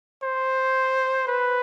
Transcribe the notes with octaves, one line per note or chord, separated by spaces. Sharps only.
C5
B4